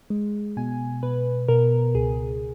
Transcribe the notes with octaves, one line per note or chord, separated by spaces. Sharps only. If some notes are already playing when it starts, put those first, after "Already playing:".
G#3
B2 G#5
B2 B4
B2 A#4
C#2 G#4